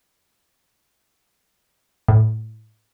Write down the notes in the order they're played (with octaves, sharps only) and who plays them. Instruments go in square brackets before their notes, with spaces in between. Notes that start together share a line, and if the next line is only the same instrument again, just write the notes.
[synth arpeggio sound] A2